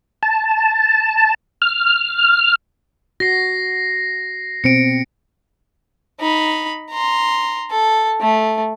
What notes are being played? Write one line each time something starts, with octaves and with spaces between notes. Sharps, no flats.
A5
F6
F#4 A#6 C7
B2 C4 C#7 D7
D#4 B5
A#5 C6
A4
A3